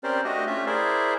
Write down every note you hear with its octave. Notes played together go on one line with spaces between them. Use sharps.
C4 C#4 G4 A#4 C5 D5
A3 D4 F#4 G4 D#5
A3 C#4 F4 G4 E5
E4 G#4 A#4 C5 D5 E5